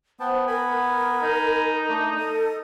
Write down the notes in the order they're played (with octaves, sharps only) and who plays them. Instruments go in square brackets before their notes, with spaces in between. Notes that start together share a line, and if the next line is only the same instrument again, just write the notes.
[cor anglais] B3 [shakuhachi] C5 [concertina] G5 A5
[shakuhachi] A#4 [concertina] G#5 B5
[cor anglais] B3
D#4
[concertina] A3 D4
[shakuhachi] A4 [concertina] D#5